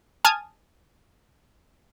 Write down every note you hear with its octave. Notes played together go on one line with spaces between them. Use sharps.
G#5 A5 D#6 F6 G#6